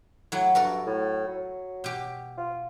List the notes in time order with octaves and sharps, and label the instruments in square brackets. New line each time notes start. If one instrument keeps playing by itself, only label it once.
[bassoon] A2 [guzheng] F#3 E4 F#5
[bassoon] G2 [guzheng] F#4 A4 A#4
[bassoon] A2
F#3
[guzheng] B2 G4
[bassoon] F4